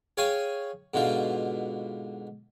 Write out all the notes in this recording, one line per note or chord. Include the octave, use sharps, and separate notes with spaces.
G#4 C#5 F5 G5 G#5
G#2 B2 D3 F4